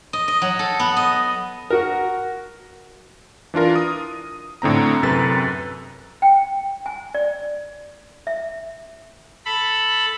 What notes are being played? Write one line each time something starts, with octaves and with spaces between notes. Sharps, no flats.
D#5
D#5
F#3
A4
B3
D#5
F#4 A#4
E3 D4 F4 A#4
D#6
A2 D3 C4 A#5
F#2 C3 A4 B4 A6
G5
G#5
D5
E5
A4 B5